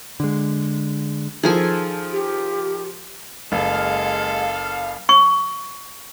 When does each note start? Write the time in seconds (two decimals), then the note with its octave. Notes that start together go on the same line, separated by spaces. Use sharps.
0.20 D3 G#3
1.43 D#3 F3 G#4 A4 G#5
2.12 G4
3.52 F#1 G#3 A4 F5
5.09 C#6